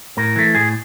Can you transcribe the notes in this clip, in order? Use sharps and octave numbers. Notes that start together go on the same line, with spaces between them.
A2 A#4
E3 A3
A2 G#4